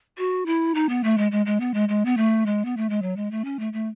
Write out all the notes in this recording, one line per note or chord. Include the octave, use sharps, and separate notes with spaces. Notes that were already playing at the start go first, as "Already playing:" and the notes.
F#4
E4
D#4
B3
A3
G#3
G#3
G#3
B3
G#3
G#3
B3
A3
G#3
B3
A3
G#3
F#3
G#3
A3
C#4
A3
A3